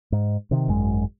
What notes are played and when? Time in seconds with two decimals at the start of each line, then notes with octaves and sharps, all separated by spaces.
0.12 G#2
0.51 C3 D#3
0.68 G#1 F#2 G#3